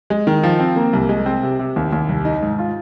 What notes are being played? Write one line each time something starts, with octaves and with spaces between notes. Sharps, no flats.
G#3
D#3
F3
C4
A#3
C2
G#3
C4
C3
C3
D#2
D#2
C2
D#4
G#2
F4